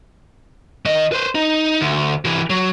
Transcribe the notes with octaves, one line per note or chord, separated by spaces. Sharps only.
D#3 D#5
B4 C5
D#4
D2
C3 E3
F#3